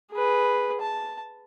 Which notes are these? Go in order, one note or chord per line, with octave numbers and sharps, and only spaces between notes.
G#4 B4
A5